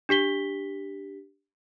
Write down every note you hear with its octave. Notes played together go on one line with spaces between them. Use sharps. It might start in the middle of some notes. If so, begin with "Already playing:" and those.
D4 G4 B6 G7